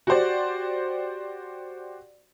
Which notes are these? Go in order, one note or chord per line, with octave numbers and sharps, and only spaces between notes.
F#4 G4 C5 D5